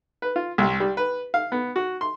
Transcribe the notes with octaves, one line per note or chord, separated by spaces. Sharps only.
B4
F4
C2
G3
B4
F5
B3
F#4
C6